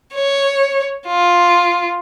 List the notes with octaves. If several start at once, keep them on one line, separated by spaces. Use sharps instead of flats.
C#5
F4